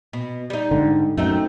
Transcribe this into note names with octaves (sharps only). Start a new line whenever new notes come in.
B2
G3 D#4
G#2 D3
F#2 A3 C4 D#4